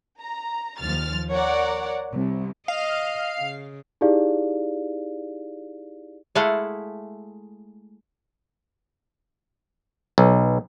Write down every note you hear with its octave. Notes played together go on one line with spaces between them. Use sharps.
A#5
D#2 F3 F6 A6
A#4 C#5 D5 F#5
C2
D#5 F5
C#3
D#4 E4 G4 G#4 D5 F5
G#3 A3 E4 A4 F5 F#5
B1